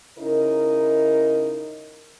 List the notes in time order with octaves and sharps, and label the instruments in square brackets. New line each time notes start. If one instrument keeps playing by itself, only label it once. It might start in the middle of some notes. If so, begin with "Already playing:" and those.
[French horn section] C#3 D#4 E4 A#4